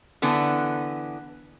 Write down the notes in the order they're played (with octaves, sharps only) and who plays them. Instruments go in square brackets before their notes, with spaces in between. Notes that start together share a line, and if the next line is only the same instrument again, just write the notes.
[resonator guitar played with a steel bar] D3 E3 B3